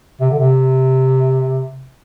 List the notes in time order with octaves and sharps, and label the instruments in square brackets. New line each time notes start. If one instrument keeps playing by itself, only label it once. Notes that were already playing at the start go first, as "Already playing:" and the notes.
[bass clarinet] C3
D3
C3